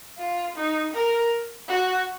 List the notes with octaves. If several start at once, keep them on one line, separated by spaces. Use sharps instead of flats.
F4
D#4
A#4
F#4